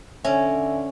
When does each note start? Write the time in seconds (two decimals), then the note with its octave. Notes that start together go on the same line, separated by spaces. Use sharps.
0.25 D3 C#4 E5 G#5